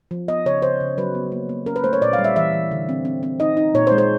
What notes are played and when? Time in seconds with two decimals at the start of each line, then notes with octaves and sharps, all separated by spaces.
0.11 F3
0.28 B3 D#5
0.46 C#3 C#5
0.62 C#3 C5
0.80 C#3
0.98 F#3 B4
1.15 B3
1.32 A#3
1.49 A#3
1.66 C#4 A#4
1.76 B4
1.84 A3 C5
1.93 C#5
2.02 A#2 D5
2.13 F5
2.19 G3
2.24 E5
2.36 E3 E5
2.53 E3
2.71 D3
2.89 C4
3.05 C4
3.23 C4
3.40 D#4 D#5
3.57 D#4
3.75 A#2 C#5
3.87 C5
3.92 G#3
3.98 C5